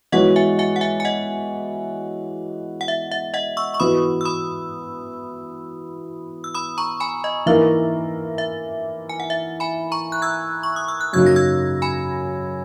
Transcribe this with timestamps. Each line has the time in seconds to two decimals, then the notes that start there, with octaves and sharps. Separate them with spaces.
0.12 E3 G#3 B3 F#4 C#5 D#5 F#5
0.36 E5 G#5
0.59 E5 G#5
0.76 F#5
0.81 E5 G#5
1.00 G#5
1.05 D#5 F#5
2.81 F#5
2.88 E5
3.11 E5
3.34 D#5 F#5
3.57 C#6 E6
3.74 C#6
3.80 E3 B3 F#4 B4 B5 D#6
4.21 E6
4.25 B5 D#6
6.44 E6
6.54 B5 D#6
6.78 A#5 C#6
7.00 G#5 B5
7.24 D#5
7.46 E3 A#3 D#4 A#4 E5
8.38 E5
9.09 G#5
9.20 F#5
9.30 E5
9.60 G#5 B5
9.92 A#5 C#6
10.12 F#6
10.22 E6 G#6
10.63 C#6
10.76 D#6
10.88 E6
11.01 F#6
11.13 F#2 C#3 F#3 A#3 D#4 E6 G#6
11.26 A#6
11.36 E6 G#6
11.82 G#5 B5